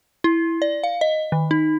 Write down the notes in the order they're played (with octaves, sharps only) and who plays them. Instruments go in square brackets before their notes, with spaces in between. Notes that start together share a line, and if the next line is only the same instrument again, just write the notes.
[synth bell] E4
D5
F5
D#5
D#3
D#4